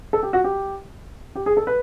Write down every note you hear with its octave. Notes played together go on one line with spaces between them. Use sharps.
A4
G4
F#4
G4
G4
G#4
A4
B4